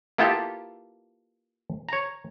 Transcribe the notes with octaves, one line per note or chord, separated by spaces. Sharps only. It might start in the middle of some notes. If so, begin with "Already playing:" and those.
A#3 B3 E4 F4 G4 A4
C#5 A#5